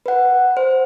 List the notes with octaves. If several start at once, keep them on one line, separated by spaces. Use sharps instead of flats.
B4 F#5
C5